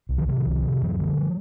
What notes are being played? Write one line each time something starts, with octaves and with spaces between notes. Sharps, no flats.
C2
D#3 F3
C3 E3 F#3
D#3 F3
C2
C3
F#2 E3 F#3
D3 F3 G3
F3 G3